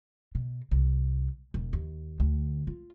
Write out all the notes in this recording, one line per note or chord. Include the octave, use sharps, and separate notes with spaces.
B2
C2
E1
D#2
D2
F4